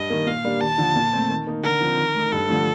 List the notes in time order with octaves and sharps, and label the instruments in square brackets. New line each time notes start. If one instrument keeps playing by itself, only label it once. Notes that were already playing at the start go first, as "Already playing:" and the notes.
Already playing: [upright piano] G2 [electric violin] D#5
[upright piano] D#3 A#3
[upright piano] A#2 [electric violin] F5
[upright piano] G3 A#3 D4
[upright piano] D#2 [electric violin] A5
[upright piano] D3 F3
A#2
A3 C4
D#3
A#3 D#4
[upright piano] D3 [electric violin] A#4
[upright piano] F3 C4
D#3
A3 D#4
[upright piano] G2 [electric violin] A4
[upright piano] D3 F3 A3